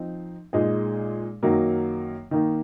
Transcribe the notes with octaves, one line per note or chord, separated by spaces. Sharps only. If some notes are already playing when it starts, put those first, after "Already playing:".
Already playing: F3 C4 D#4
A#2 G#3 D#4 G#4
F#2 D#3 F#3 A#3
D#3 A#3 D#4